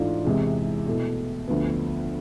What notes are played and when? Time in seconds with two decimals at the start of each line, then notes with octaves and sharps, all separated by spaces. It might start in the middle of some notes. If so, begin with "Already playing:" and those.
Already playing: G#2 E3 A3 D4 F4
0.25 E2 C3 E3 G#3
0.86 B2 A3 E4
1.48 D2 D3 F3 B3